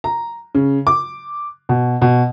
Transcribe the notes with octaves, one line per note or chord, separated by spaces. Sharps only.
A#5
C#3
D6
B2
B2